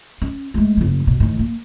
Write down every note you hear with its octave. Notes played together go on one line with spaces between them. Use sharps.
C#4
G#3 A3
F#1 F#3
B2
A2 D#3
A#3